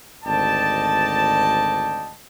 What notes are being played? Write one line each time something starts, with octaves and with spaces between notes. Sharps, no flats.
G#1 D2 D5 D#5 G5 A5